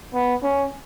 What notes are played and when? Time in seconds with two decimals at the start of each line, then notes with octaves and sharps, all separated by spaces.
0.14 B3
0.43 C#4